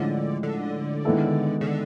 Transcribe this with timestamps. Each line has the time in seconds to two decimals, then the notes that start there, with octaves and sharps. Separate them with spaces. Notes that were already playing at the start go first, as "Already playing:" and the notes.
Already playing: A2 D3 F3 G#3 C#4
0.43 D3
1.05 D#3 G#3 B3 E4 A4
1.61 C#3
1.67 D3